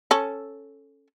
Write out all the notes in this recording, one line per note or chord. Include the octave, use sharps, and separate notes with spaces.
C#4 A4